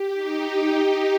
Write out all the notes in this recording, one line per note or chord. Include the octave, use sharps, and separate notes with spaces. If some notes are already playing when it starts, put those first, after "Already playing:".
Already playing: G4
D#4
G4